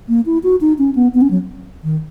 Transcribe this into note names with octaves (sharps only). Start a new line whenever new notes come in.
A#3
E4
F#4
D#4
C#4
B3
B3
C#4
F#3
D#3